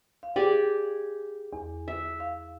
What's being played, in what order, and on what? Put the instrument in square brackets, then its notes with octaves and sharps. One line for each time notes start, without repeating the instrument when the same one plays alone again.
[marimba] F5
[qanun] G4 D5 G#5 [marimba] G#4
[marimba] E2
[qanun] E5
[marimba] F5